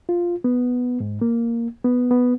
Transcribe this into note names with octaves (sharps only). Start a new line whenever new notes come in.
F4
B3
G#2
A#3
B3
B3